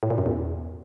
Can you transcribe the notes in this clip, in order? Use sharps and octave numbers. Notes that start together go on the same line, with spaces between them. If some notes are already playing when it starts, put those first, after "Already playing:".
A2
A#2
F#2
E2